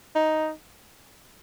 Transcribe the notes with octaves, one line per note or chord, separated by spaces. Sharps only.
D#4